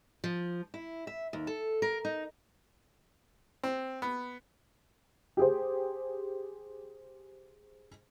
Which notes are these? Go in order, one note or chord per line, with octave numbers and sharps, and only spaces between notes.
F3
E4
E5
D#2
A4
A#4
D#4
C4
B3
G4 G#4 C5